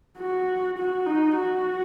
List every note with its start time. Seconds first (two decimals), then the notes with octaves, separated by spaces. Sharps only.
0.18 F#4
0.78 F#4
1.07 D#4
1.36 F#4